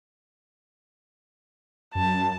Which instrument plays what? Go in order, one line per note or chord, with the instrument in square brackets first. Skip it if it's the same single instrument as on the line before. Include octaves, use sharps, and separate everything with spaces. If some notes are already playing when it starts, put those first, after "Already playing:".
[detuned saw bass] F#2 [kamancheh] A5